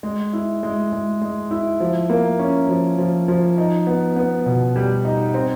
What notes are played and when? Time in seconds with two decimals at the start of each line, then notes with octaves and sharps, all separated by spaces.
0.03 G#3
0.33 E4
0.63 G#3
0.92 G#3
1.22 G#3
1.51 E4
1.80 F3
2.10 A#3
2.39 C#4
2.69 F3
2.98 F3
3.28 F3
3.58 D#4
3.87 B3
4.16 B3
4.46 B2
4.76 G3
5.05 D#4
5.34 C4